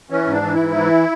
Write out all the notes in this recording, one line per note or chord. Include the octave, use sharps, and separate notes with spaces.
E3 C#4
G#2
D4
E3
G#2 E4
E3